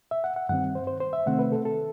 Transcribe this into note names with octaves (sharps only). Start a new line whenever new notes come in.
E5
F#5
F#5
G2 D#3 G3 C4 F#5
C5
C5
C5
E5
C3 D#3 A3 C4 F#5
B4
A4
A4